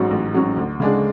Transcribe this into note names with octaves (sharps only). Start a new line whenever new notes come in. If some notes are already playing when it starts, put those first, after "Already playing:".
Already playing: A1 G#2 F#3 C#4 F#4
A1
G#2 F#3 C#4 F#4
D2
C#3 G#3 D4 G#4